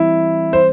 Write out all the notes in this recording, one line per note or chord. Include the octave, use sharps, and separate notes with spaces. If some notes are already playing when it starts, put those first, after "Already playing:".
Already playing: E3 G3 C4 E4
C5